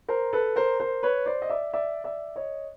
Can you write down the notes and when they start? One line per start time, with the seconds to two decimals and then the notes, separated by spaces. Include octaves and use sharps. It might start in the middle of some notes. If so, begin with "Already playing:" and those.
0.08 A#4 C5
0.33 A4 B4
0.56 A#4 C5
0.80 A#4 C5
1.03 B4 C#5
1.26 C5 D5
1.42 D#5
1.49 D5 E5
1.73 D5 E5
2.04 D5 E5
2.36 C#5 D#5